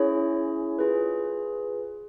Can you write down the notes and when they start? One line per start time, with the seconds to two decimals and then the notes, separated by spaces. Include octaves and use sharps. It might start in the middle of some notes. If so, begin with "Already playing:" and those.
Already playing: C#4 E4 G#4 C#5
0.79 F4 G#4 B4